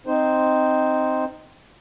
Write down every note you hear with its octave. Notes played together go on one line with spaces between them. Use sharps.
C4 D#4 C5